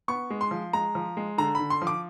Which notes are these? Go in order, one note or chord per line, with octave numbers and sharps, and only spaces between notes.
B3 C#6
G#3
C6
F3
G#3 A#5
F3
G#3
D3 A#5
D3 B5
C6
F3
D6